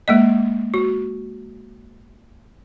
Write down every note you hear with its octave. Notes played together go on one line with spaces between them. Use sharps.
G#3 A#3 D#5
F#4